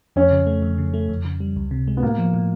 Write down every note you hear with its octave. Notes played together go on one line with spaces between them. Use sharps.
F2 C#4
C#3
A3
F2
C#3
A3
F2
C#3
G3
C#2
C3
G#3
B3
A2 A#3
F3
A2